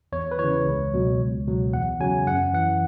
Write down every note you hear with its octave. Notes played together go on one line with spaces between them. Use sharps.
E2 C#5
B4
C#3 E3 C#5
C#2
B2 F#3
C#2
B2 F#3
E2 F#5
C#3 F#3 G#5
F#2 F#5
E3 F#5